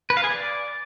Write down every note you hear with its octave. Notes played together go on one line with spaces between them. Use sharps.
B4
F5
G#4
D5